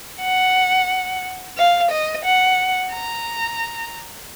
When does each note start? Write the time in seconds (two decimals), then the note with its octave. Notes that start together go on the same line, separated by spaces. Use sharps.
0.22 F#5
1.57 F5
1.91 D#5
2.25 F#5
2.93 A#5